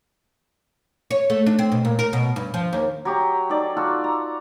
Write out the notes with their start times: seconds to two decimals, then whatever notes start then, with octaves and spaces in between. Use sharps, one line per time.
1.11 C#5
1.30 A3
1.46 D4
1.59 C4
1.72 B2
1.85 A#2
1.99 A#4
2.13 B2
2.36 G2
2.54 F3
2.73 D#2
3.05 F#3 G4 A#5
3.50 D#4 A4 D5
3.77 F4 F#4 A4
4.04 A#5